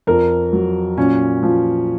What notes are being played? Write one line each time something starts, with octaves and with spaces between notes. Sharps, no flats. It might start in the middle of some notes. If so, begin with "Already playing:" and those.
F2 A#4
F#3
A#2 C#4
F3